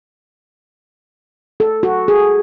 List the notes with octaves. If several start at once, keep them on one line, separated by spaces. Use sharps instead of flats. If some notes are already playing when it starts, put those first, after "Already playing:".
A4
F#4
G#4